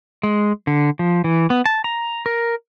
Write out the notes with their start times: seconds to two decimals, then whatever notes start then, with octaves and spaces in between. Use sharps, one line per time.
0.23 G#3
0.67 D3
0.99 F3
1.24 E3
1.50 B3
1.66 A5
1.84 A#5
2.26 A#4